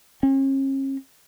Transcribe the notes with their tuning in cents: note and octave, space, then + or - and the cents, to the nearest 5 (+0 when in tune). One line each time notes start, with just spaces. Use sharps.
C#4 -40